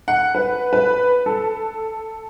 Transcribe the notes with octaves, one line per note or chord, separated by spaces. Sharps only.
F#5
B4
B4
A4